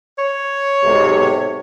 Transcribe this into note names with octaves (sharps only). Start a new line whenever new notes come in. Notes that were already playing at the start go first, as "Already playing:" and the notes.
C#5
B1 G#2 C3